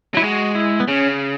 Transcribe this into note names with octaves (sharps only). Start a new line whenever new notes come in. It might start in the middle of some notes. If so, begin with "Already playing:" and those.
F#3 E4
G#3 F#4
E4
B3
C#3 C#4